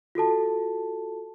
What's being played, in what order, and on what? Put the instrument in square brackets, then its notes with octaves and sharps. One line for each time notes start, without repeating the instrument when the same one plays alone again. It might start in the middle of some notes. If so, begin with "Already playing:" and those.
[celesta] F4 F#4 A4 A5